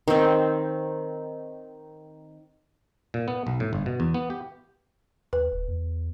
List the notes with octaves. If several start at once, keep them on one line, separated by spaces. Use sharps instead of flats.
D#3 C4
A#2
B3
B1
A2
G1
B2
E2
B3
G4
D#2 B4
D#1
E2